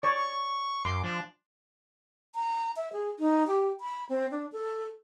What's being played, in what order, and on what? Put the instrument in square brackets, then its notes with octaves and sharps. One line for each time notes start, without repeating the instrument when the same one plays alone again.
[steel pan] C#5 D5 [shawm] C#6
[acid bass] F#2 [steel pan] C6 [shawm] D6
[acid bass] F3 [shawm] D4
[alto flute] A#5
E5
G#4
D#4
G4
B5
C4
D4
A4